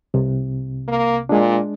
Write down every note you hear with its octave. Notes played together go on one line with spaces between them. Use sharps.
C2 C3
A#3
A#2 G#3 D4